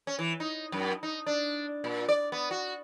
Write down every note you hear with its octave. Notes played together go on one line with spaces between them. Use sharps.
C#4
E3
D#4
F#2
D#4
D4
A#2
D5
B3
F#4